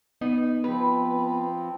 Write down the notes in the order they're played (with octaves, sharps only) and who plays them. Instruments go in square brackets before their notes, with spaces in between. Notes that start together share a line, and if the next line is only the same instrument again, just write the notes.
[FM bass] B3 [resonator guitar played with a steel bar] D#4
[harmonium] F3 C4 [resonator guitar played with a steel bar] B4